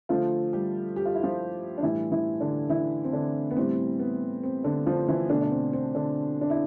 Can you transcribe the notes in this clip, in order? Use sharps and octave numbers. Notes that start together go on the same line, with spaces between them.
D3 F3 A3 F4
G3 G4
G4
F4
E4
F3 F4
D4
A2 E3 G3 E4
E3 E4
D3 D4
E3 E4
C4
D3 D4
B3
A2 E3 G3 C4
B3
C4
D3 D4
F3 F4
E3 E4
B2 D3 A3 D4
D4
C4
C4
D3 D4
D4
E4